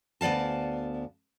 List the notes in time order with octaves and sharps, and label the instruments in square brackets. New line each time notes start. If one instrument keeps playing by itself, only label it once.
[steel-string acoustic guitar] D2 B3 D5 F5 A5